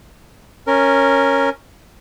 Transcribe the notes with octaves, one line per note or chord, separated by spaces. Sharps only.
C#4 A#4